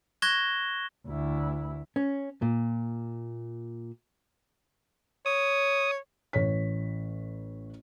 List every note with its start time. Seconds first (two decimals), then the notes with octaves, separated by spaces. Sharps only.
0.22 C#6 F#6 G#6 A#6 E7 G7
1.07 D2 E4
1.96 C#4
2.42 A#2
5.26 C#5 D#6
6.33 A1 C#5 B6